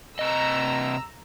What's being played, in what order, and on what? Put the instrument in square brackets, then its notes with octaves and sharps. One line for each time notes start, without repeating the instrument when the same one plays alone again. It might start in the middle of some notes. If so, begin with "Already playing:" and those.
[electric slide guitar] C3 D#5 [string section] A#5 E6